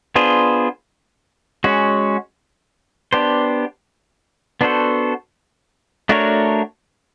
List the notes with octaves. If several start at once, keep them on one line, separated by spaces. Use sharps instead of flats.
B3 D4 F4 G#4 C5
G#3 C#4 F#4
B3 D4 G4 C5
B3 D4 F#4 A4 C5
A3 D4 F#4 A#4 C#5